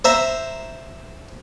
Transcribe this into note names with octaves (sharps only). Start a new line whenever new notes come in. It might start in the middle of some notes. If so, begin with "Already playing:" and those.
C5 E5 A#5